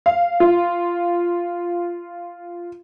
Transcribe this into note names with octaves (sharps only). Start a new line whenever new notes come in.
F5
F4